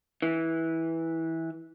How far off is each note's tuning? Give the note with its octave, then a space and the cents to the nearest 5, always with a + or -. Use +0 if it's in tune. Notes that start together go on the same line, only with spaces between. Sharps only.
E3 -15